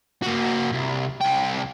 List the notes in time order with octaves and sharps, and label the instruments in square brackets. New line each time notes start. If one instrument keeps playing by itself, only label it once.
[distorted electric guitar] A#3 F#4
C2
C2 G5